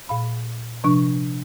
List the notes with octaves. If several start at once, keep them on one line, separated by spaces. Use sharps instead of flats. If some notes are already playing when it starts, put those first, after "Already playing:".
A#2 F5 B5
C3 F3 D4 C#6